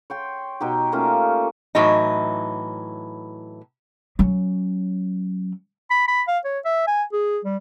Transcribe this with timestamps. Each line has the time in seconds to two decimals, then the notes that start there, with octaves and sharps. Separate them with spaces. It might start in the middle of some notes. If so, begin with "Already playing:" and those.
0.10 C#5 G5 C6
0.60 B2 D#4 G4
0.92 A3 A#3 C#4 F4
1.75 A2 E3 F#3 D#4
4.19 F#3 C#4
5.90 B5
6.08 B5
6.28 F5
6.45 C#5
6.65 E5
6.87 G#5
7.12 G#4
7.45 G3